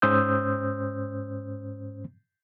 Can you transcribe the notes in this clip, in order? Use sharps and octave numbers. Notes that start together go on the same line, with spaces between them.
G#2 C#4 C5 D#6 E6 G6